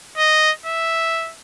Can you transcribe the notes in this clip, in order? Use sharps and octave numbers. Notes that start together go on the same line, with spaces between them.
D#5
E5